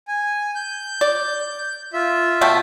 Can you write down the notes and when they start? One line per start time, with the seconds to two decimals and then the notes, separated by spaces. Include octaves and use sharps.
0.08 G#5
0.55 G6
1.01 D5
1.93 F4 E5
2.41 B2 A3 G5